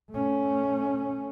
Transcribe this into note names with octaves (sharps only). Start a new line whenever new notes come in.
A3 C#4